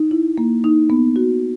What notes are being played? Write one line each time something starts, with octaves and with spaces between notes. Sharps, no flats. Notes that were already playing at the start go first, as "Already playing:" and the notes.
Already playing: D#4
E4
A#3
D#4
B3
F#4